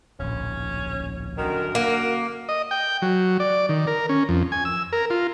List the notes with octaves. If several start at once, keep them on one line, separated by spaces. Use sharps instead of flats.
D1 A#1 C#4
F#2 D3 D#3 A#4
A#3 F#4
D#5
G5
F#3
D5
D#3
A#4
C#4
F2
G#5
E6
A#4
F4